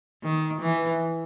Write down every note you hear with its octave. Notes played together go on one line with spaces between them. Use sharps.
D#3
E3